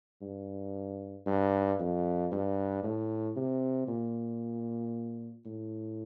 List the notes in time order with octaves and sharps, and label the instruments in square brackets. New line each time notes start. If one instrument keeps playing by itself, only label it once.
[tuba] G2
G2
F2
G2
A2
C3
A#2
A2